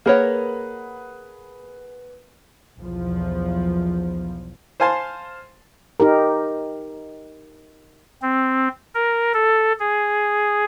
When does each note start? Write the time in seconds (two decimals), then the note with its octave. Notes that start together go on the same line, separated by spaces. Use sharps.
0.06 A#3 G#4 A#4 B4 C#5 F#5
2.78 B1 E2 F3
4.80 C5 F5 G#5 A5 C6
6.00 D#4 G4 A#4
8.22 C4
8.95 A#4
9.34 A4
9.79 G#4